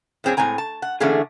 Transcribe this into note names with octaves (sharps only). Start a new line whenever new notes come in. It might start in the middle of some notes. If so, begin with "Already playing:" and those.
F2 A2 C4 G#4 C#5
A2 G#3 C4 G#5 A#5
A5
F#5
D3 E3 A3 A#3 C#4 G#4